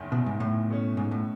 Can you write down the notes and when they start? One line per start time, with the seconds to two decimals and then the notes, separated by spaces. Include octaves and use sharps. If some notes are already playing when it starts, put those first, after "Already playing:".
Already playing: F#1 E2 D#3
0.12 B2
0.26 G#2
0.40 A2
0.69 B2 A3 C#4
0.97 G#2
1.11 A2